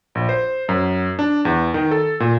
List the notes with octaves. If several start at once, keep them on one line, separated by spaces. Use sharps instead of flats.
A#1
C5
F#2
D4
E2
D#3
A4
A#2